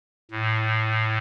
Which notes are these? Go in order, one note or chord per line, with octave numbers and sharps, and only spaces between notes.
A2